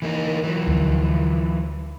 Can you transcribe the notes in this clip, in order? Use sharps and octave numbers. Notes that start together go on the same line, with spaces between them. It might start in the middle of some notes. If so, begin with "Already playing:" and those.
E3 A#3 D#4
E3 F#3
D2 F3